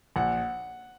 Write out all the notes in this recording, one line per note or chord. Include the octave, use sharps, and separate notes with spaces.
A#1 F#5